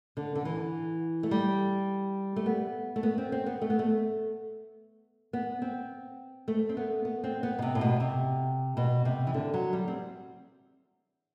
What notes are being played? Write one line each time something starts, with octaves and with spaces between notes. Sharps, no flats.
D3
D3
E3
A3
G3
A3
B3
A3
B3
C4
C4
B3
A3
B3
A3
B3
C4
A3
C4
B3
B3
C4
B3
B2
C3
A2
B2
C3
B2
C3
E3
D3
F#3
G3
C4